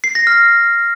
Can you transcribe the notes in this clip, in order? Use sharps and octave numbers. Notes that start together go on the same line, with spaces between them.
C7
A#6
F6